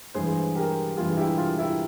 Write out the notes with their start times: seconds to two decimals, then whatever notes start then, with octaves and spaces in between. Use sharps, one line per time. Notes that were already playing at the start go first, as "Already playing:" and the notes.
0.14 G2 E3 G#3 G#4 C5
0.55 G4 A#4
0.97 G2 E3 G#3 F4 G#4
1.17 E4 G4
1.38 F4
1.58 E4 G4